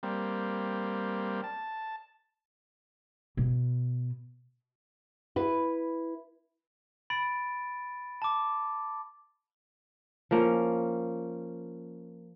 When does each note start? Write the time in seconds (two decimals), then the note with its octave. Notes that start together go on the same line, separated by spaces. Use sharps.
0.03 G3 A#3 C4
1.44 A5
3.37 B2
5.36 E4 B4
7.10 B5 A6 D7
8.22 A5 D6
10.31 F3 A#3 C#4